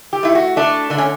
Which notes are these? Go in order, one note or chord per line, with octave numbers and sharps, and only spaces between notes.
G4
A3 E4
F#4
A3 D4
D3 D4
C#4